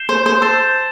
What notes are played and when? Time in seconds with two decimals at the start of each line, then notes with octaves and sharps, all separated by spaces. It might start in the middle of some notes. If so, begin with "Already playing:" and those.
Already playing: G6 C7 E7 G7
0.09 C5
0.26 C5
0.42 C5 A5 E6 A6 E7